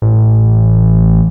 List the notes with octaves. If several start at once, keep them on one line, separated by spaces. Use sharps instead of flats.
A1